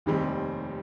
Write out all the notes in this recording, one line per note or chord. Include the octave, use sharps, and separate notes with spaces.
F1 D#2 D#3 G3 C4